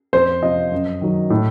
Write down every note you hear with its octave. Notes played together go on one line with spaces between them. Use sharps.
F2 C5
C3 F3 D#5
F#2
D#3 F#3
A2